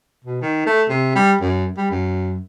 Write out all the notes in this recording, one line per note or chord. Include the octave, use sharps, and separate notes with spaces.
B2
D#3
A3
C3
G3
F#2
G3
F#2